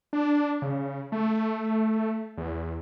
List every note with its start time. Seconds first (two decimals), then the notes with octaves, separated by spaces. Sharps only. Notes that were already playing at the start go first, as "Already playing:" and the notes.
0.13 D4
0.62 C#3
1.12 A3
2.38 E2